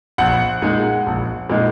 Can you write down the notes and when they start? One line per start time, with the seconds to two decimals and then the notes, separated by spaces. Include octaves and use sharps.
0.18 A#1 F#5
0.62 A#2 G#3 D#4
1.06 A#1
1.50 A#2 G#3 D#4